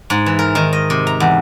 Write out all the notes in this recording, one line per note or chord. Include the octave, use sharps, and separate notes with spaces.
G#2
E3
A#4
D#3
D#5
C3
A#5
E2